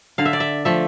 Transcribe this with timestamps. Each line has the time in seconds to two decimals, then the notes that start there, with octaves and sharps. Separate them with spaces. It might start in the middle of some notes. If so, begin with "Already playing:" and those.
0.18 D3 F5
0.26 E5
0.33 D5
0.40 E5
0.65 F3 A3 E5